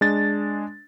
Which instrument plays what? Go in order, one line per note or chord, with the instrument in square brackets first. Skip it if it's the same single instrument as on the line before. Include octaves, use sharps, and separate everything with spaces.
[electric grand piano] G#3 D4 A6